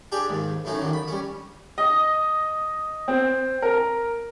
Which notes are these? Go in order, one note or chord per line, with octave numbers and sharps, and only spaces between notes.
D4 G4 G#4 D5
D#2 G#2
A2 F#3 C#4 D#4
D#2 D3 D#3
B5
G3 C#4
D#5
C4
A#4